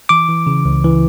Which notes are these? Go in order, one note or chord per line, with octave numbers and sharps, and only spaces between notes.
E3 D6
E3
C#3
C#2
E3